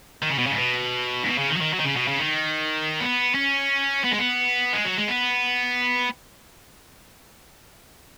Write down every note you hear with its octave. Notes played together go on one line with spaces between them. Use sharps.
D#3
C#3
B2
C#3
G#2
B2
G#2
B2
C#3
D#3
F#3
D#3
F#3
D#3
C#3
B2
C#3
D#3
B3
C#4
B3
G#3
B3
G#3
F#3
G#3
B3